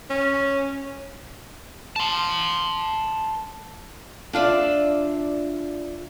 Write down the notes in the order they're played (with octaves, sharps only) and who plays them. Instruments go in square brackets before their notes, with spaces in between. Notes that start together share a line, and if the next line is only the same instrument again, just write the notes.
[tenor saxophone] C#4
[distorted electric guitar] A5 C6
[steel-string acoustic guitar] D4 F4 D5 E5